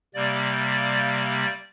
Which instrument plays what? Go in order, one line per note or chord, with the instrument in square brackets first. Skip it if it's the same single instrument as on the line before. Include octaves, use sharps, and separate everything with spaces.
[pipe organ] C3 G3 A#3 D5